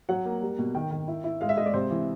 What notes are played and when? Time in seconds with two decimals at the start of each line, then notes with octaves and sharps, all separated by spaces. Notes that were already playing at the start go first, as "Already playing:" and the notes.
0.09 F#3 F#5
0.26 A#3
0.41 G3
0.59 B2
0.75 D#3 G5
0.91 D#3
1.08 E4
1.24 E4
1.41 G#3 F5
1.49 E5
1.57 G#3 D#5
1.66 D5
1.74 C3 C5
1.91 E3